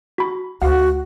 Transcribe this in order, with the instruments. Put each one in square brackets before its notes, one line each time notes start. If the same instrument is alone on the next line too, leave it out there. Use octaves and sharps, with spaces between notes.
[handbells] F#4 B5
[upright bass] D2 [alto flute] F#4 [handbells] F5 F#5